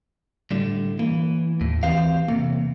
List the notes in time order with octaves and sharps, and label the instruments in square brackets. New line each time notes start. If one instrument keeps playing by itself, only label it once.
[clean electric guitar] A2 D3 [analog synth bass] G3
[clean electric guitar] E3 [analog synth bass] A#3
[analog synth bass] D#2 [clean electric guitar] A2
[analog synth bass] E3 [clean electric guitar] C4 G4 F5
[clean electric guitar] E2 C3 [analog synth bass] A#3